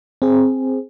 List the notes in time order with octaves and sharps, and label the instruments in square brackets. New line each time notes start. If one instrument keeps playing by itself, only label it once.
[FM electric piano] C4 G#4